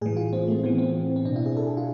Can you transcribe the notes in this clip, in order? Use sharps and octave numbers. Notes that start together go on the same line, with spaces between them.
A2 E3 G#4
F4
C4
A3
A2 E3 B3
C4
C4
B2 D4
E4
G#4
A4
G#4
F4